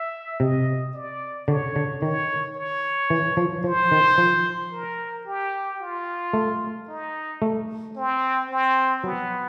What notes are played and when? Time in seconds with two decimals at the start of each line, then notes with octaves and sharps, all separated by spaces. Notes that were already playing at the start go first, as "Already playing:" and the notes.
Already playing: E5
0.40 C3 D#5
0.94 D5
1.48 D3 C#5
1.76 D3
2.02 D#3 C#5
2.56 C#5
3.10 E3
3.37 F3
3.64 F3 C5
3.92 D#3
4.18 F3
4.72 A#4
5.26 G4
5.81 F4
6.33 A3
6.88 D#4
7.42 A3
7.96 C4
8.50 C4
9.04 F#3 B3